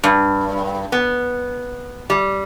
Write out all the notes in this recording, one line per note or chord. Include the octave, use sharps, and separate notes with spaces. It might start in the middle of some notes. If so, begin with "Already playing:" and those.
G2
B3
G3